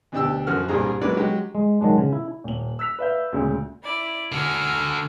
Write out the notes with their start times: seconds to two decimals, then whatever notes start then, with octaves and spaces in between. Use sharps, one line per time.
0.12 D2 B2 D4 G4 E6
0.47 F#2 F3 F#4 F6
0.68 C2 G2 A#2 G3 G#4 A#5
1.01 F#3 G#3 A#3 B4 D5
1.17 F#3 G#3 G4
1.55 G#3
1.81 D#3 F#3 G#3 D4
1.98 C#3
2.12 E4
2.44 D#1 F#7
2.79 E6 F#6 B6 F7
2.99 B4 D5 E5 F5 G6
3.33 D2 A#2 C#3 G#3
3.84 E4 D5
4.32 D3 F#4 G#5 C#6 F6